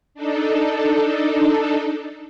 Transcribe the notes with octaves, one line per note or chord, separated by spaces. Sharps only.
D4 D#4 A4